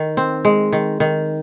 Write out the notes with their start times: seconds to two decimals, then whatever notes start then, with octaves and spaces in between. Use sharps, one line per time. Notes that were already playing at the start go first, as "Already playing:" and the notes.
Already playing: D#3
0.17 C4
0.45 G#3
0.72 D#3
1.00 D#3